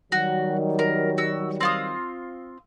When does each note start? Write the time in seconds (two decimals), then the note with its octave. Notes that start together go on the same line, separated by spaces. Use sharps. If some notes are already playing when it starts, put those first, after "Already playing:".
0.12 D#3 F#3 G3 F#4
0.79 A#4
1.18 F#4 E6
1.60 C4 F4 D#6